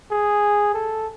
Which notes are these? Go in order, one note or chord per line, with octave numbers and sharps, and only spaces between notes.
G#4
A4